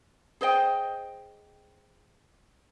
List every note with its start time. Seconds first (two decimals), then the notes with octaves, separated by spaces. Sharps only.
0.41 G#4 C5 D#5 G5